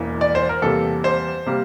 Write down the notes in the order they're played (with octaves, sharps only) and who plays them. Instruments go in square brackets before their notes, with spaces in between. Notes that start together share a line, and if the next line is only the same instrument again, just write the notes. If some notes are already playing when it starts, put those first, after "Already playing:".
Already playing: [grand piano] E1 E2 E3 A#3
D5
C5
A#4
E2 C3 G3 A#3 A4
C5
C3 G3 A#3